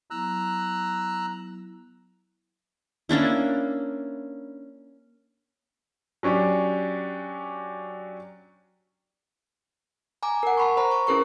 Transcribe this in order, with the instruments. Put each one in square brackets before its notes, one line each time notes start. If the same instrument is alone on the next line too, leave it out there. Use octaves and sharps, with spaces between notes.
[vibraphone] F#3 B3 E4 [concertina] A#5 E6 F#6
[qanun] A#3 C#4 D4 E4
[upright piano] F#3 C#4 D4 G4
[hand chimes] G#5 A#5 D6
A#4 F#5
A5 B5 C#6
C5 A#5 B5
C#6
C#4 E4 G#4 A#4 B4 C#6